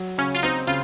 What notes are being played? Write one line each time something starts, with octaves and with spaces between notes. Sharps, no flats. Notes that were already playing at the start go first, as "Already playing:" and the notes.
Already playing: F#3
C#3 C#4
F4
C4 D#4
C#3 F4